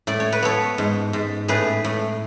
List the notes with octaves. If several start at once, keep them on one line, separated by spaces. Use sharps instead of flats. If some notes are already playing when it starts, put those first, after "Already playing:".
A2 D5
C#5
B4
B3 A4 C#5
G#2
G#2
A2 G#4 B4
A2